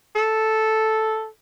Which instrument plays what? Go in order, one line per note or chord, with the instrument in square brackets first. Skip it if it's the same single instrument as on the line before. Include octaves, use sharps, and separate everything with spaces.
[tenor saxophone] A4